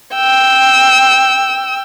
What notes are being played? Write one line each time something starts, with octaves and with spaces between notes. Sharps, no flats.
G5 E6